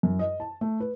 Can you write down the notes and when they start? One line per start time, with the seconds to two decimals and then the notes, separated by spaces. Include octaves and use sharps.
0.03 F#2
0.19 D#5
0.40 A5
0.61 A3
0.80 B4